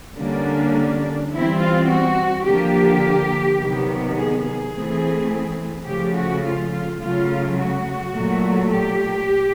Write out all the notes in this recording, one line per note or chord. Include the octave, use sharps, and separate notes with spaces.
D3 G3 A#3 C#4 D4
E3 G3 C4 E4
F4
F#4
D3 F3 A#3 G4
C3 D#3 F#3 B3
G#4
G#4
E3 A3 C4
C#3 F3 A3 G4
F#4
F4
F4
C#3 F#3 A3 F4
F#4
A#2 F#3 A3
G4